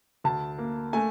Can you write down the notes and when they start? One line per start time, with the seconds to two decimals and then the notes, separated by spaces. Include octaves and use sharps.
0.24 D2 A5
0.58 A#3
0.93 A3 G#5